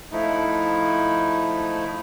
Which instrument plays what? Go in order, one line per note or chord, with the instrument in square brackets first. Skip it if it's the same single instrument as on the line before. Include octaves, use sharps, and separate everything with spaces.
[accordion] F3 A3 D#4 E4